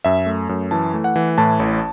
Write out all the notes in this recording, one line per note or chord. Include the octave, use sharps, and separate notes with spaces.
F#2 E5
A3
F#2
E3 A5
A3
F#5
E3
A2 A5
A1